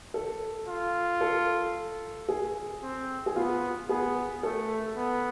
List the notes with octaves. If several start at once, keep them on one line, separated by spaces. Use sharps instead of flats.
A4
F4
A4
G#4
C4
G#4
B3 F4
B3 G#4
A3 A4
B3